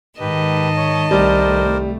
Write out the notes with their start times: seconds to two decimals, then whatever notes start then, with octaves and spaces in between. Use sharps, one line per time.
0.19 G#2 D#3 G4 B4 D#5 A5
0.76 C#5
1.11 C2 G3 A3 A#4 C5 D5